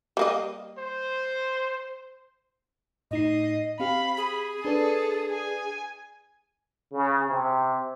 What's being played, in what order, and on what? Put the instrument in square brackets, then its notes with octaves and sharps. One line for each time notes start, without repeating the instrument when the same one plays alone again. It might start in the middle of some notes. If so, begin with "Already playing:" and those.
[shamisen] G3 A#3 D#5
[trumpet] C5
[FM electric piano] A2 D#4 C7 [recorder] D#5
[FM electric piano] C4 G4 [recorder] F5 [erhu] B5
[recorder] G#4
[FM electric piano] D4 B4 D5 [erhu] A4
[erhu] G#5
[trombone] C#3
C3